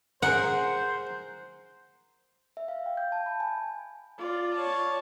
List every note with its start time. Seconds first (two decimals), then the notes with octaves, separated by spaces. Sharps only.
0.22 G#4 A#4 C5 F#5
2.57 E5
2.68 F5
2.86 G5
2.97 G6
3.12 A5
3.26 B5
3.40 G#5
4.18 F4 D5
4.54 C#5 A5